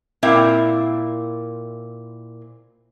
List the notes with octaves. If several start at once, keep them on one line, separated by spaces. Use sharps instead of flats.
A#2 C4 E4 A#4 E5